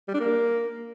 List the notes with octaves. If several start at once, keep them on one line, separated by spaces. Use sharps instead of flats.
G3
D4
A#3